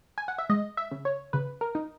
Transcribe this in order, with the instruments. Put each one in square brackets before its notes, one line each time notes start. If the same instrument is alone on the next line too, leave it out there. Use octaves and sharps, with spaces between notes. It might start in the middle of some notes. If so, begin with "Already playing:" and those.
[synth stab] G#5
F#5
E5
G#3 D#5
E5
C#3
C#5
C#3 B4
A#4
D#4